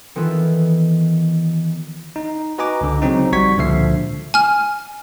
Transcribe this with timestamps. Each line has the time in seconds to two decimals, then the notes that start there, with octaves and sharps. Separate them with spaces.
0.16 D#3 E3 B3 F4 A4 B4
2.16 D#4
2.58 F#4 B4 D#5 G#5 A#5 D6
2.81 C#2 D3
3.02 C#3 F#3 C4 D#4
3.32 A#1 G3 F#4 C#6 G#6 B6
3.57 C#2 A#2 D3 F3 E5 C7
4.34 G#5 F6